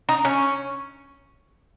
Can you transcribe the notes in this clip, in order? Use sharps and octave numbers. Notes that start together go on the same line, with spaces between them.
D#4
C#4